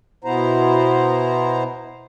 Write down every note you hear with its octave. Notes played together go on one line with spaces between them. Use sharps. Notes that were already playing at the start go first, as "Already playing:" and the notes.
B2 B3 E4 C5 A#5